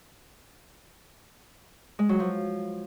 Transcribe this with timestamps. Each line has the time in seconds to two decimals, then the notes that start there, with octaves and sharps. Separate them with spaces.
1.99 G#3
2.09 F#3
2.20 F3